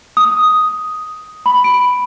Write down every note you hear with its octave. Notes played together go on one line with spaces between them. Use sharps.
D#6
B5
D7